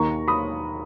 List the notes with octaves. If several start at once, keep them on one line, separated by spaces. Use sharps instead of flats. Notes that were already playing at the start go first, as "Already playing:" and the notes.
Already playing: D#2 D#3 A#3 A#5 C#6
B5 D#6